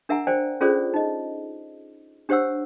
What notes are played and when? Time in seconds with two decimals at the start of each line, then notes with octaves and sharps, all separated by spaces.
0.09 D4 A#4 E5 F#5 G#5 A#5
0.27 C5 D5 G5 G#5
0.61 C#4 F4 G#4 A4 C5 D5
0.94 D#4 D#5
2.29 D4 G4 C5 C#5 F#5 E6